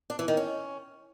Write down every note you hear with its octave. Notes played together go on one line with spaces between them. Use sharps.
D4
E3
D#3
C#4